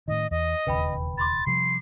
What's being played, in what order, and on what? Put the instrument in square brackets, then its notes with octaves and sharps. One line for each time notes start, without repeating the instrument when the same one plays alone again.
[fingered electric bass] A2 D#3 [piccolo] D#5
[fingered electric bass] E2 [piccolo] D#5
[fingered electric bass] E1 D#2 C#3 [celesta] B4 G5 B5
[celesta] B5 C6 D6 [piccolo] A6
[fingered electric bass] C3 F3 G3 [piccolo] C7